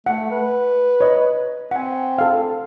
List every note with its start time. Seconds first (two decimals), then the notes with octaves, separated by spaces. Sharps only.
0.06 A3 F#5
0.31 B4
1.01 C#5 D#5
1.71 C4 F#5 G#5
2.18 A4 F5